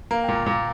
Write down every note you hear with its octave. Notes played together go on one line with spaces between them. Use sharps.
A#3 A#5
A#2 G5
A#5
A#2